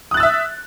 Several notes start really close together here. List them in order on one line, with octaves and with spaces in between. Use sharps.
D#6 F#6 A6 E6 E5